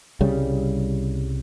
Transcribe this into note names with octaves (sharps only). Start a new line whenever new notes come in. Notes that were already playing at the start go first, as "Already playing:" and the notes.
C2 C#3 G3